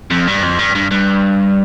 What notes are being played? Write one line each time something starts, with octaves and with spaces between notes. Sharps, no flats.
F2
G2
F2
G2
G2
G2